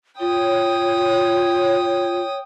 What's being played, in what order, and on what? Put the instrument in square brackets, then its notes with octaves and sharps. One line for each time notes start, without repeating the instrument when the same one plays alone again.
[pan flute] F4 [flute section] C#5 [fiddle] G5 D#6